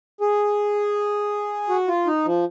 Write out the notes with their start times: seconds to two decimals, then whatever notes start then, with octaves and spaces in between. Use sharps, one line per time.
0.21 G#4
1.69 F#4
1.88 F4
2.07 D#4
2.25 F3